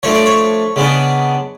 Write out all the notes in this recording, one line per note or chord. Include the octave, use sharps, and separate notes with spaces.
F3 A3 D4 C#5
D5
C#5
C#3 G#3 B3 D4